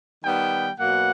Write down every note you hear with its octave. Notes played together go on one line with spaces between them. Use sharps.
D#3 G3 B3 G5
B2 F#3 A#3 F#5